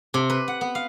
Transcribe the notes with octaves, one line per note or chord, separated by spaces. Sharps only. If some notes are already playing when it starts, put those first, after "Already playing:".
C3
B4
F#5
B3
F5